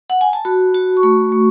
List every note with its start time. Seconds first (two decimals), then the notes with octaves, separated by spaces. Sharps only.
0.10 F#5
0.21 G#5
0.33 A5
0.45 F#4 B5
0.74 F#4
0.97 C#6
1.03 A3 B5
1.32 A3